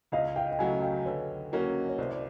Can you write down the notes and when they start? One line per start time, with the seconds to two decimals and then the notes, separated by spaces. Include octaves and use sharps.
0.12 C#2 D#5 F5
0.36 F5 G5
0.51 G5
0.59 C#3 F#3 A3 F#5 G#5
0.82 F5 G5
1.05 D3 B4 C#5
1.52 F#3 A#3 C#4 F#4
1.89 C#5
1.98 C2 C5 D5
2.10 D5